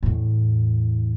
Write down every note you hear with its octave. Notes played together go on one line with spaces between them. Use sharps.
E2 A2